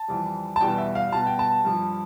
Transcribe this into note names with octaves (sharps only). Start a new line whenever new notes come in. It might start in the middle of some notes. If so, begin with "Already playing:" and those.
Already playing: A5
F2 E3 G3
A5
E2 B2 G3 G5
E5
F5
B2 G3 A5
G5
A5
G2 F3